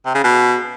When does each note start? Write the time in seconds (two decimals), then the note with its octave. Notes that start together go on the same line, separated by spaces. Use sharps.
0.05 C3
0.15 C#3
0.24 B2